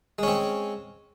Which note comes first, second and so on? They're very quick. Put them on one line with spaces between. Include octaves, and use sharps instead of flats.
G#3 C#4 C4